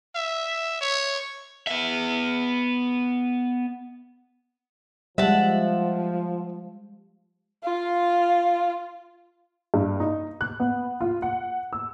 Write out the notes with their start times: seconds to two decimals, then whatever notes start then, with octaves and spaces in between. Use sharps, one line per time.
0.15 E5
0.81 C#5
1.67 B3 E5
5.18 F3 G3 G#3 E5 F#5 A5
7.63 F4 F5
9.74 G2
10.00 D#4
10.41 F#6
10.60 B3
11.01 F4
11.22 F#5
11.73 E6